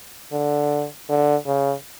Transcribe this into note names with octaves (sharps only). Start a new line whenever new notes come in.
D3
D3
C#3